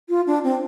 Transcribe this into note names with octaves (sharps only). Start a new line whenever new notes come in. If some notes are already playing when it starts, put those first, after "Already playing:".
F4
D4
C4